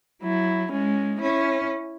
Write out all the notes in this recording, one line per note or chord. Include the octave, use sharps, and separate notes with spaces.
F#3 E4
G#3 C#4
C#4 E4